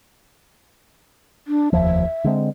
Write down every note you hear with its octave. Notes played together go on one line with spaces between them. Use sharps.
D4
F1 D#2 F3 E5
D3 G#3 C4